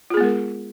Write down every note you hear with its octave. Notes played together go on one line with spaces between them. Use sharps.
G#3 B3 F4 G#4 A#4